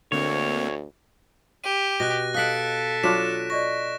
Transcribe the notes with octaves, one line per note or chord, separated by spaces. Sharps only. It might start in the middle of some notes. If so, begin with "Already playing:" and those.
D2 D3 A#3 C4 C#5
G4 D#7
B2 F#6 A#6
A4 D#5 F5 F#5 F#6 B6 D7
F#3 D4 F4 B6 E7
D5 D#5 C#6 A#6